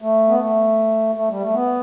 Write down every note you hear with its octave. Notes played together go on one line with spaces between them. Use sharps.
A3
B3
A3
A3
G3
A3
B3